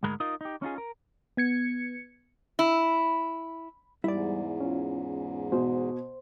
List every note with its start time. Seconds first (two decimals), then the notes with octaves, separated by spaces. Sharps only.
0.03 D2 G#2 G#3 A#4 B5
0.20 D#4 F4 A#4 D#5
0.41 D#4 G4
0.62 C#4 D#4 F4 G#4
0.78 A#4
1.37 B3 G#6 C#7
2.59 E4
4.04 E2 G#2 G3 E4 D5
4.61 C#4 F4
5.52 B2 C5